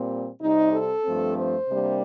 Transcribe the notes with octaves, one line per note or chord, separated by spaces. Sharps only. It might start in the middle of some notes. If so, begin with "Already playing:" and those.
Already playing: A#2 G3 C4
C3 G3 C4 D#4
A4
G2 F3 A3 C4
C5
C3 G3 A#3 D4